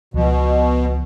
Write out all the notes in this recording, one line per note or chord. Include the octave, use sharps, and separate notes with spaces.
C#2 B2 F3